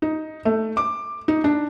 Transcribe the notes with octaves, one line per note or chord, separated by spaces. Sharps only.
D#4
A3
D6
D#4
D4